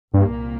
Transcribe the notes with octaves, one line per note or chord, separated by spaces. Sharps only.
C2 G2 A#2 A#3